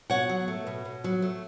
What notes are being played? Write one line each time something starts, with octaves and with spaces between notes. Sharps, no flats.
B2 C#5 F#5
F#3
A3
B2
B2
F#3
A3